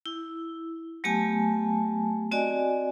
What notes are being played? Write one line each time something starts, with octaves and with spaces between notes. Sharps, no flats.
E4
F#3 A3 B3 G4 G#5 A5
C4 F#4 D5 D#5 G#5